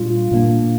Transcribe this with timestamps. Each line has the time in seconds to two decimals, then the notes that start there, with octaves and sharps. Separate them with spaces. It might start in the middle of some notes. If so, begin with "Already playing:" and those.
Already playing: A#2 G3 D4 F4
0.31 A#2 G3 A#3 D4